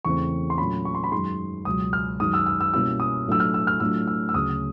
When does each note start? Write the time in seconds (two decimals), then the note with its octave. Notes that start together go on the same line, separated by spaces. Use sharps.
0.05 E2 C#3 E3 A3 C4 C#6
0.50 C6
0.58 A#2 F#3 A3 C#4 F4 B5
0.85 C#6
0.95 C6
1.04 B5
1.12 F#2 D#3 G#3 C6
1.65 C#2 B2 F#3 D#6
1.93 F6
2.20 F#2 D#3 G#3 D#6
2.34 E6
2.46 E6
2.61 E6
2.73 B2 G3 A#3 C#4 E4 E6
3.00 D#6
3.27 A2 F#3 A3 D4 F4 E6
3.40 F6
3.54 E6
3.67 F6
3.80 A2 F#3 A3 D4 F4 E6
4.07 E6
4.29 E6
4.34 D2 C#3 F#3 D#6